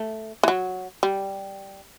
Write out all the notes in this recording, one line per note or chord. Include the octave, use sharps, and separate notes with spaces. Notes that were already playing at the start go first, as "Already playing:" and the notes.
Already playing: A3
E3
F#3
G3